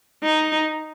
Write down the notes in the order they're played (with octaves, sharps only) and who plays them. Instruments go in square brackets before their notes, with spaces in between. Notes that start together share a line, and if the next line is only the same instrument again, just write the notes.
[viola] D#4